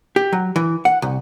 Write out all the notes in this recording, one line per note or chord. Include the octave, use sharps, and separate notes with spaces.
G4
F#3
E3
F#5
C2